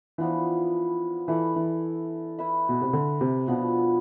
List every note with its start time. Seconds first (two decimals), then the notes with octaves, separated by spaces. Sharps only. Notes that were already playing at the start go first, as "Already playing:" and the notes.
0.18 E3 F3 B3 D4 F4
1.28 E3 E4 A4 D5
1.56 E3
2.39 E4 B4 E5
2.69 B2
2.82 C3
2.93 D3
3.21 C3
3.47 B2 F3 B3 D4